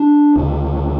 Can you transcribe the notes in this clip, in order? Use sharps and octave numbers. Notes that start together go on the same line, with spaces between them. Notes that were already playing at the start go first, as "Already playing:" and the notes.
Already playing: D4
D2 C#3